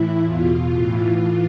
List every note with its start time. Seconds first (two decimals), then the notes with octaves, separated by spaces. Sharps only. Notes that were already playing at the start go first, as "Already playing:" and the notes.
Already playing: A2 E3 E4
0.23 E2 B2 F4
0.72 A2 E3